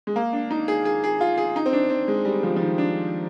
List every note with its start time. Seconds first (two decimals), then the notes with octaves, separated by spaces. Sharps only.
0.07 G#3
0.16 A#3
0.33 D4
0.51 D#4
0.68 G#4
0.85 G#4
1.04 G#4
1.21 F4
1.38 G#4
1.56 D#4
1.66 C4
1.73 D4
1.90 C4
2.08 G#3
2.25 G3
2.43 F3
2.56 F3
2.60 D#3
2.78 D4